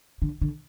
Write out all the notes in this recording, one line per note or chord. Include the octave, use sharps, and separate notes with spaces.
D3
D3